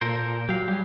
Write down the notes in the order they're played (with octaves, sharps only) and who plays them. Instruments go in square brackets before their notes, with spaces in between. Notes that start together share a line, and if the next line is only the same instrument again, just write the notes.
[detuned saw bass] A#2 [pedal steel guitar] A4 A#4 C5
[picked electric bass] F#3 [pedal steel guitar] G4 F5
[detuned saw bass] G3 [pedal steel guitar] G4 G#4